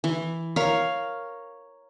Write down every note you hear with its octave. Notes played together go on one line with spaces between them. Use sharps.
E3
A#4 C#5 F5